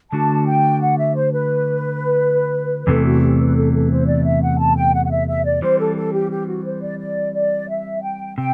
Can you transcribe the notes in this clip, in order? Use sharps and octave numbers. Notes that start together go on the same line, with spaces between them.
D3 A3 D4 F#4 A5
G5
F#5
E5
C5
B4
E2 C3 E3 A3 A4
F#4
G4
B4
A4
A4
C5
D5
E5
F#5
A5
G5
F#5
F#5
E5
E5
D5
E3 G3 C4 C5
A4
A4
G4
G4
F#4
C5
D5
D5
D5
E5
G5
C3 G5